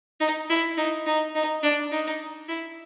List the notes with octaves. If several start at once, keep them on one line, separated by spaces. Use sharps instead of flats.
D#4
E4
D#4
D#4
D#4
D4
D#4
E4